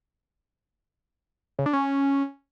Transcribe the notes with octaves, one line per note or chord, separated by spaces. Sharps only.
C#3
D4
C#4